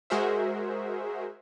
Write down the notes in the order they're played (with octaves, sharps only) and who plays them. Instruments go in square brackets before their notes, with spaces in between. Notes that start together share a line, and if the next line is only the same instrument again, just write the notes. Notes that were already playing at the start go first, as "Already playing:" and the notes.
[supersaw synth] G#3 F#4 G#4 A#4 C5 E5